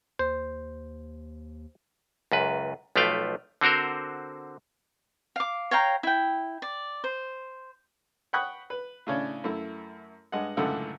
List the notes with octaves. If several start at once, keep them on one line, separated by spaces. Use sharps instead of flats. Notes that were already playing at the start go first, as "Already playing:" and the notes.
D#2 C5
C#2 F#2 B4
B1 F3 A3 B4 F5 G5
D3 C4 F#4 A#4 C5
F5 D6
C#5 F5 G5 A#5
E4 G5
D5
C5
F#5 G5 B5 C#6 D#6 F#6
B4
A2 C#3 C#4 D4
F#2 A3 E4
G2 G#3 D#5 F#5
C#2 F#2 A2 D3 A4 F#5